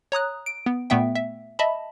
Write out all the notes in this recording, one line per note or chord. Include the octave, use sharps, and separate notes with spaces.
C#5 A#5 D#6 F#6
D7
B3
A#2 A3 B3 E5 G5
E5
D#5 E5 A5 B5